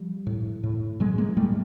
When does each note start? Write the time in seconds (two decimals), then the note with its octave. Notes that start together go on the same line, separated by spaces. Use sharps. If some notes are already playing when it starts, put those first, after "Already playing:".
Already playing: F3 G3
0.27 A2
0.63 A2
1.00 A2 F#3 G#3
1.18 G#3 A#3
1.37 A2 G3 A3